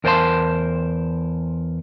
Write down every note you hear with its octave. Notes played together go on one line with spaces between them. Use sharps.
E2 A#4 C5 D5 A5 C6